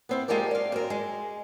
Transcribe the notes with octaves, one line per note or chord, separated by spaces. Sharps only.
B3 C4 E4
G#3 F4 G4 A4 A#4 D5
D5 F5
F#2 C4 A#4
G#3